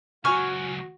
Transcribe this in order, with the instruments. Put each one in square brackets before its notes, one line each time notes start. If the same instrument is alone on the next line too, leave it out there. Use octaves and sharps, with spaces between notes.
[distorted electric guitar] C#2 F#3 [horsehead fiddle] F#4 [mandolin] G#5 F6 [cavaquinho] C#6